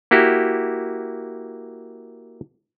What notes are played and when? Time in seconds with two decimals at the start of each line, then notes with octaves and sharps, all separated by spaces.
0.11 A#3 E4 F#4 G4